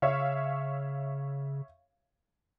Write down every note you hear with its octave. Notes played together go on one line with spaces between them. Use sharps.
C#3 C#5 E5 F5